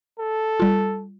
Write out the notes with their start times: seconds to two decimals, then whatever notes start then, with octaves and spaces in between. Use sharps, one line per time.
0.19 A4
0.60 G3 F4